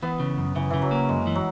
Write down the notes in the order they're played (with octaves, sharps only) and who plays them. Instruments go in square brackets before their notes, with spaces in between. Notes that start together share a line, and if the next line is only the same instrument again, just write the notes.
[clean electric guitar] E3 [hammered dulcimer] B3
[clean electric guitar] C#3
F#2
[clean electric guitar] C#3 [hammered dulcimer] E3
[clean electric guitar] C#3 [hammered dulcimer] E3
[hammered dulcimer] F#3
[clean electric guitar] A#3
[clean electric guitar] F#2 [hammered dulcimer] G#3
[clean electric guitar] E3
[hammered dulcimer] F#3